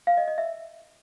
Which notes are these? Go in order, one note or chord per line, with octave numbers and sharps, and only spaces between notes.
F5
D#5
D#5
E5